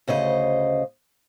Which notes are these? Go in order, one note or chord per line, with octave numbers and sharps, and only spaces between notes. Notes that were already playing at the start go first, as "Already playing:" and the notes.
D2 C#3 C5 D#5